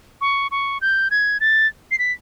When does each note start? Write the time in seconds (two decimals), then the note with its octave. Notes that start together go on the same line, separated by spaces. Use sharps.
0.21 C#6
0.51 C#6
0.81 G6
1.11 G#6
1.40 A6
1.91 C7
1.99 B6